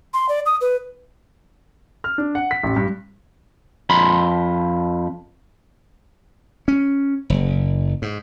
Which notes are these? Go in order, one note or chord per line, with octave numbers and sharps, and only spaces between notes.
C6
D5
D#6
B4
F6
D4
F#5
B6
A1
G2
F2 B5 C6
C#4
F#1
G#2